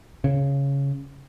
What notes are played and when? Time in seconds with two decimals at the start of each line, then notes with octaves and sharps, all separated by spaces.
0.24 C#3